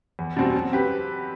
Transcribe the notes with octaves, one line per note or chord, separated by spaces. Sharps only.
E2
B2 G3 C4 F#4
F#3
C4 G4 B4